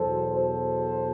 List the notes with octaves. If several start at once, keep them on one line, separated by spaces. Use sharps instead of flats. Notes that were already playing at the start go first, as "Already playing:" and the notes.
Already playing: E2 B2 F#3 B3 A4 C5
A4 C5